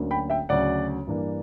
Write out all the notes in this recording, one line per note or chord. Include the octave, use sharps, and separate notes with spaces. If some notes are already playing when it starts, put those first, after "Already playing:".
Already playing: D2 D3 F#3 A#3 C#4
G5 B5
E5 G5
D2 C#3 F#3 C#4 D5 F#5
G2 E3 A#3 D4